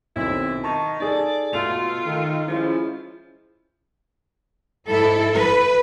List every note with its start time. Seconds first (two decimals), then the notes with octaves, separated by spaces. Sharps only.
0.16 B1 D#3 C4 E4
0.63 D#3 A5 C#6
1.00 D#4 G#4 A4 D5
1.53 B2 A3 F4 F7
2.06 D#3 A3
2.48 F3 G#3 C#4 E4
4.88 G#2 E4 A4
5.34 B4